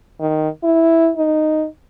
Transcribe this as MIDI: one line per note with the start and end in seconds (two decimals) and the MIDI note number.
0.20 0.49 51
0.64 1.11 64
1.17 1.66 63